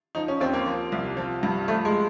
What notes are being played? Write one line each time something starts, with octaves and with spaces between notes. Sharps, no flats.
F3 D#4
C#4
D#2 C4
A#3
F3
C2
F3
G2
F3 A3
G#3